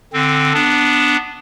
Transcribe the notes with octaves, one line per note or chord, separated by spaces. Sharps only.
D3 C4
B3 D4